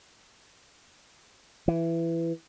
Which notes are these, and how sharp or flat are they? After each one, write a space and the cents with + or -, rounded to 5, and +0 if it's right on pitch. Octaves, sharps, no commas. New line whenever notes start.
E3 +15